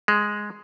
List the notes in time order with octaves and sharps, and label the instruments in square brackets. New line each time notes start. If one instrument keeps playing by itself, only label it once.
[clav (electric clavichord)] G#3